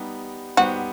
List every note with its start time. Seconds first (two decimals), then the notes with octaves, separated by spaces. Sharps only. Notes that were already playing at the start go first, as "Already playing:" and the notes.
Already playing: G3 B3 D#4 G4
0.57 G3 B3 D#4 F#4 G4 C5